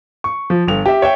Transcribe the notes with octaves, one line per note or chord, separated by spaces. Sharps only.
C#6
F3
G1 F7
G4 E5
C#5 E5 G5